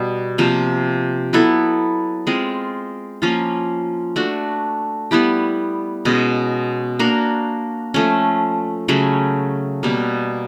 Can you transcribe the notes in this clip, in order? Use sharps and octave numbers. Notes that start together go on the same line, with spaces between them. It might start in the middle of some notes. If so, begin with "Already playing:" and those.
Already playing: B2 G3
C3 F3 A#3
F#3 B3 E4 A4
G#3 C4 F4
F3 A#3 C#4 F4
A3 D4 F#4
G3 B3 E4 G4
B2 G#3 C#4
A#3 D4 F#4 A#4
F3 A3 C#4
C#3 F#3 A3 C#4
B2 G3 A#3